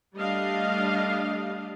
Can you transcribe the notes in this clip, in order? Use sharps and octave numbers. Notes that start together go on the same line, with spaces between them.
G3 A3 D4 D#5 F5